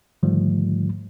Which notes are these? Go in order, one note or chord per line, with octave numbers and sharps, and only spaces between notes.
G#2 D3 D#3 F3 G3 A3